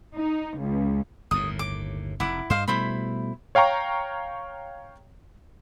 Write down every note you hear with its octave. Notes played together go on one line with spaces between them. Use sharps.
D#4
C#2
G1 D#2 A2 D#6
D6
F1 E4 F#5 D6
G2 C5 D#5 F5
B2 G3 A3 E4 C5 B5
C#5 F5 G5 A#5 C#6